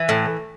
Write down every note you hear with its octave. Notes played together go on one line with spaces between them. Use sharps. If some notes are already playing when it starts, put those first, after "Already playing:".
Already playing: E3
A2